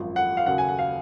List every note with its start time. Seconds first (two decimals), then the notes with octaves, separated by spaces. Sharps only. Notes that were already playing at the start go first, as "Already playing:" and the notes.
Already playing: G#1 F#2 F3
0.16 F#5
0.37 F5
0.46 D#2 C#3 F#3 F#5
0.58 G#5
0.69 F#5
0.79 F5